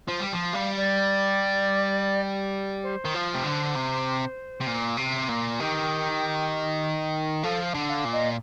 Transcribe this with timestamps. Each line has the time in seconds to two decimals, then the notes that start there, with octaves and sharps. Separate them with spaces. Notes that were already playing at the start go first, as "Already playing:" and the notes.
0.07 F3 C5
0.20 G3
0.33 F3
0.53 G3 F5
0.77 D5
2.83 C5
3.05 D#3
3.15 F3
3.34 C3
3.44 D3
3.76 C3
4.61 C3
4.67 A#2
4.97 C3
5.29 A#2
5.59 D#3 G4
7.43 F3 A4
7.74 D3
7.89 F5
8.05 A#2
8.12 D#5